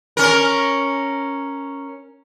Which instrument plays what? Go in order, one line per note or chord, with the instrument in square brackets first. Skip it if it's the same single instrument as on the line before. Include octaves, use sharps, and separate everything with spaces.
[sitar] C#4 A#4